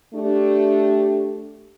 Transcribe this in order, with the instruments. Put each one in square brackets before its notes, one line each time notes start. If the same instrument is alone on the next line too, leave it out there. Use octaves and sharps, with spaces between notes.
[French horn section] A3 D4 G4